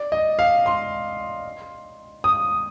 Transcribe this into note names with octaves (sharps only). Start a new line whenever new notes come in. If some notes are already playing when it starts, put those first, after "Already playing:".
Already playing: D5
D#5
F5
C6
D#6